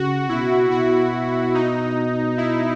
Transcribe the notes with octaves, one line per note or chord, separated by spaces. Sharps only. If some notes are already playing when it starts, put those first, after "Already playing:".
Already playing: C#3 F#4
B2 E4
B2 F#4
D#4
E4